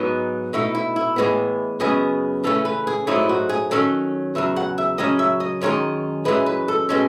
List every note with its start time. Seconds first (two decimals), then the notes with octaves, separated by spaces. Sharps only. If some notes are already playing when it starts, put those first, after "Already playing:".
Already playing: G#2 F#3 B3 D#4
0.53 B2 A3 D#4 E4
0.75 E4
0.96 E4
1.16 A2 E3 G#3 B3
1.80 F#2 C#3 G#3 B3 G#4
2.44 C#3 E3 A3 C#4 A4
2.65 B4
2.87 G#4
3.07 G#2 F#3 A3 D#4 E4
3.29 F#4
3.49 G#4
3.71 D#3 F#3 C#4 A4
4.35 E2 C#3 F#3 E5
4.56 F#5
4.78 E5
4.98 F#2 C#3 F#3 C#4 D#5
5.19 E5
5.40 D#5
5.61 F#2 D#3 G#3 D#4 C#5
6.25 F#2 E3 G#3 B4
6.46 B4
6.68 A4
6.89 B2 G#3 C#4 A4